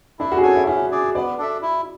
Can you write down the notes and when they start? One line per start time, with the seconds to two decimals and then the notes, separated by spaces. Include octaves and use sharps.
0.19 D4 E4
0.32 F#4
0.38 G#4
0.43 F#4 A4 C#5 G#5
0.55 E4
0.67 C#4 E4
0.91 G#4 D5
1.15 B3 D5
1.38 D4 A4 E5
1.62 E4